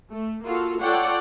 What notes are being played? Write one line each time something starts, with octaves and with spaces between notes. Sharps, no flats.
A3
A#3 F4 F#4 A4
F4 A4 C#5 D5 F#5 G5